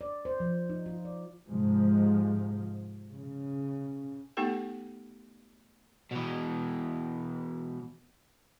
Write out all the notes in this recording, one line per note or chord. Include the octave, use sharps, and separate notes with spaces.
D5
C5
F3
D#4
F4
D5
G#2 C3 F3 G#3
C#3
A3 B3 D#4 G4 A4 G5
B2 E3